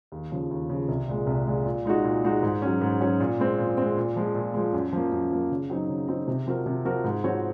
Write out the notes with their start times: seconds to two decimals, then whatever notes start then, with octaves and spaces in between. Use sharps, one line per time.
0.12 D#2
0.32 C#3 F3
0.51 D#2
0.69 C#3 F3
0.89 C2
1.08 A#2 G#3
1.27 C2
1.47 A#2 G#3
1.66 A#2
1.85 G#3 D#4 F#4
2.04 A#2
2.24 G#3 D#4 F#4
2.43 G#2
2.62 F#3 C#4
2.81 G#2
3.01 F#3 C#4
3.20 A#2
3.39 G#3 C4
3.58 A#2
3.78 G#3 C4
3.97 A#2
4.16 F3 G#3
4.35 A#2
4.54 F3 G#3
4.73 F#2
4.93 F3 A#3
5.12 F#2
5.31 F3 A#3
5.51 C#3
5.70 F#3 C4 D#4
5.89 C#3
6.08 F#3 C4 D#4
6.27 C3
6.47 F3 C4 F#4 A#4
6.66 C3
6.85 F3 C4 F#4 A#4
7.04 G#2
7.24 F3 C4 F#4 C#5